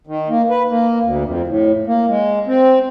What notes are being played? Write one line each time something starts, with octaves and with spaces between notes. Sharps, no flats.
D#3
A#3
B4
A#3
D2
F2
A2
A#3
G#3
C4